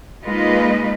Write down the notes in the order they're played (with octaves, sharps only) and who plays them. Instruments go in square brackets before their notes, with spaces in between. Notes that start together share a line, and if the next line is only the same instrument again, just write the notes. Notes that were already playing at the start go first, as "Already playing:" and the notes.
[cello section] G#3 A#3 D#4 F4 B4 D#5